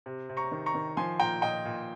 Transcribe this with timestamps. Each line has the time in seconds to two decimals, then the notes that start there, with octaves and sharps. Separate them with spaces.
0.06 C3
0.29 C3
0.37 A#5 C#6
0.52 D#3
0.66 A#5 C#6
0.75 D#3
0.97 F3 G#5 C6
1.20 A#2 G5 A#5
1.42 A#2 D#5 G5
1.65 A#2